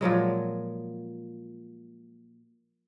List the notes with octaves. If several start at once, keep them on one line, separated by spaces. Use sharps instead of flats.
A#2 F3 F#3 G#3